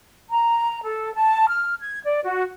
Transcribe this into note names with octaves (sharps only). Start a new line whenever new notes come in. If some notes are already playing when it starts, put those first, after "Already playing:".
A#5
A4
A5
F6
G#6
D5
F#4